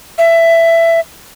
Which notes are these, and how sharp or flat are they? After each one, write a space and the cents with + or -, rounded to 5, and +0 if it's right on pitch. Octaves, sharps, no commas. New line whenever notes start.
E5 +15